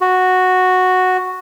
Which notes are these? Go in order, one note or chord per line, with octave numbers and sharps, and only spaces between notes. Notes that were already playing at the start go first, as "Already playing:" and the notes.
F#4